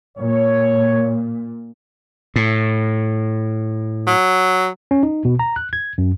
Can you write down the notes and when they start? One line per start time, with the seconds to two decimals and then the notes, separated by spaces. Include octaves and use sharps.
0.18 A#2 C#5
2.36 A2
4.07 F#3
4.91 C#4
5.03 D#4
5.25 B2
5.39 A#5
5.56 F#6
5.73 G#6
5.98 F#2